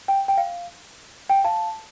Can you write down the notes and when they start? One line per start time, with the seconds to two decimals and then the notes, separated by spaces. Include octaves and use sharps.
0.08 G5
0.28 G5
0.38 F5
1.30 G5
1.44 F5 A5